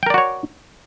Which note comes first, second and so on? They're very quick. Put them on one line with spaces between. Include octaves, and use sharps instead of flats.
G5 A#4 D5 F#4 C#5